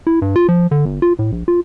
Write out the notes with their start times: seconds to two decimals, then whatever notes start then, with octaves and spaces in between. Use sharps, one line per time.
0.07 E4
0.22 G2
0.36 F4
0.48 F3
0.71 D3
0.85 G1
1.02 F4
1.19 A2
1.32 A#1
1.48 F4